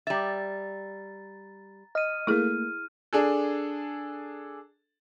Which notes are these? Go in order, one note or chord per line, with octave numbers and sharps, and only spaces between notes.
G3 E5 A#5 A6
D#5 F6 D#7
A3 A#3 E4 G#4 F6
D4 G#4 A4